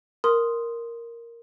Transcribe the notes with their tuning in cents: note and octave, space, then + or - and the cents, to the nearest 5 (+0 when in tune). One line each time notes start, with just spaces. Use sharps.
A#4 +0 C6 +0 D#6 +0